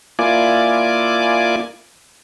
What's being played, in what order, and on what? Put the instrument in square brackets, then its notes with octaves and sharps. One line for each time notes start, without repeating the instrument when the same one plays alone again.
[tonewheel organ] A#3 E4 F4 D5 G#5 D6